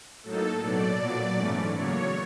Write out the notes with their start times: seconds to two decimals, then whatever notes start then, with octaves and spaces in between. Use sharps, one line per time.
0.23 A2 F#3 A#3 D#4 A4
0.61 B2 F#3 A3 D5
0.99 A#2 F#3 B3
1.37 G#2 E3 A3 C#4
1.75 C#3 F#3 A#3 C#5